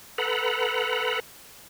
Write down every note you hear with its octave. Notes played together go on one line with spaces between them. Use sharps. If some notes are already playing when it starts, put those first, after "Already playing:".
A4 B4 F#5 A#5 B5